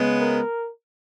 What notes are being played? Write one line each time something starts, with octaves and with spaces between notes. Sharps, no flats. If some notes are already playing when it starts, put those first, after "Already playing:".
Already playing: C#3 G#3 B3
A#4